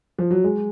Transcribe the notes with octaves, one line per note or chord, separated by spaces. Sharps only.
F3
F#3
G#3